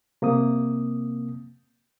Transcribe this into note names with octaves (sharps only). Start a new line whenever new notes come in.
C3 A#3 C4 D#6